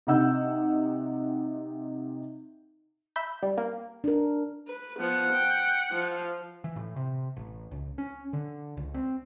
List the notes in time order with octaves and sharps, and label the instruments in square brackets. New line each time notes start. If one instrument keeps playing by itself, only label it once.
[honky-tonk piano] C3 D#4 F#5 E6 G6
[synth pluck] E5 B5 G6
G3
A#3
[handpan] D4 A#4
[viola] B4
[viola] F3 B3 [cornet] F#5
[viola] G5
F3
[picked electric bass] E3
A2
C3
A1
C#2
C#4
D3
C#2
C4